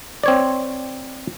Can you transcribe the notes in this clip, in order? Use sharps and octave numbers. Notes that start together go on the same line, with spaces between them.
C4 C#5 D5